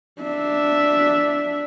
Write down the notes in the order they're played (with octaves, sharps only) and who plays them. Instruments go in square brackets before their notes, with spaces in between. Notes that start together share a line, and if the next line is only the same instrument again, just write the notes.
[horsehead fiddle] D4 E5